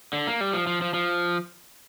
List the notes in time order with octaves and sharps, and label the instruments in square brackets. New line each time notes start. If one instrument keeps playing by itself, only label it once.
[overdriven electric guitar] D3
A#3
G3
F3
F3
F3
F3